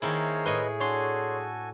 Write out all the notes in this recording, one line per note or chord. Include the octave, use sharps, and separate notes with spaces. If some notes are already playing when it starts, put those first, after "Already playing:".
D#3 A#3 E4 G#4 A#4 C5 C#5
A2 B4 D#5 G#5 C6
D4 F#4 A4 C#5 G#5 C6